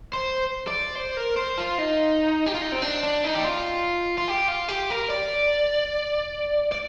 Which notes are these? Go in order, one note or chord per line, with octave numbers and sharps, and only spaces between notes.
C5
D5
C5
A#4
C5
F4
D#4
G4
F4
D#4
C4
D4
D4
D#4
G4
F4
F4
G4
F4
G4
A#4
D5
D5